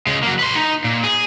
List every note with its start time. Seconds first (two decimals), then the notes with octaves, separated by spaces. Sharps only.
0.07 C#3 G#3
0.23 F#3 A#3
0.39 B4 C6
0.55 D#4
0.84 A#2
1.04 G#4